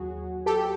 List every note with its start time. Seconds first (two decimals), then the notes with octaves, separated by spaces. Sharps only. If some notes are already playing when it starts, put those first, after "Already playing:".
Already playing: D#2 F#3 F#4 G#4
0.46 G4 A4